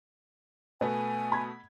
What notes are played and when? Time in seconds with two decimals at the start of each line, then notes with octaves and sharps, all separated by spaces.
0.81 B2 A3 B3 B4 G#5
1.32 B5 G#6